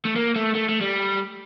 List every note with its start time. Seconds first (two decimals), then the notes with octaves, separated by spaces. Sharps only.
0.05 A3
0.16 A#3
0.36 A3
0.55 A3
0.69 A3
0.81 G3